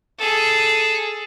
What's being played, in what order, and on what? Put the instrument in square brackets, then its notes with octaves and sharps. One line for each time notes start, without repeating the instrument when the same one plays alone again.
[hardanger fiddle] G#4 A4